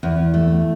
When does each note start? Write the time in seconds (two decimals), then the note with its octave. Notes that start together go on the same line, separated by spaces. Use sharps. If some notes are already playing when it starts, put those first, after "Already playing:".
0.03 E2
0.34 A3